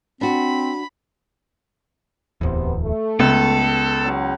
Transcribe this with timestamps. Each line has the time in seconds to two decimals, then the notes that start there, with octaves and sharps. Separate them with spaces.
0.21 C4 D4 F#4 B5
2.41 D1 E2 C3 B3 C5
2.82 A3
3.20 C#2 B3 A4
4.04 E2 F#3 C#4